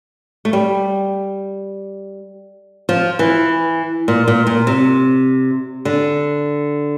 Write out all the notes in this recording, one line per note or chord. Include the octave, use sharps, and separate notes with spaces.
A3
G3
F3
E3
A#2
A#2
A#2
C3
D3